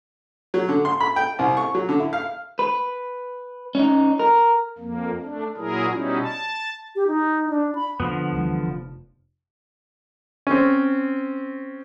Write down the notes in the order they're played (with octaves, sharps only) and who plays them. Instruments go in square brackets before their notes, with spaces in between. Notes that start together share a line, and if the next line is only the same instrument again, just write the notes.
[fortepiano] F#3
D3
C6
B5
G5
C2
C#6
F#3
D3
E4
F5
[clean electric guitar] B4
C#4 D#4
A#4
[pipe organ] F2 A#3
A3 D4
A#2 F#3 E4 G#4 A#4
B2 G3 C#4 D#4 E4
A5
[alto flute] G4
D#4
D4
B5
[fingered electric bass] F2 [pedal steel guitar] D3 F3 B3
[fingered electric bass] D2 E3 G3
F1
[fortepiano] C4 C#4